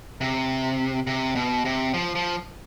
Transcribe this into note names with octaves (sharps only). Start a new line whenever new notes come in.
C3
C3
B2
C3
F3
F3